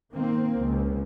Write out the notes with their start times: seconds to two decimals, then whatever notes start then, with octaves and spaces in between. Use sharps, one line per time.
0.12 D#3 A#3 C4
0.56 C#2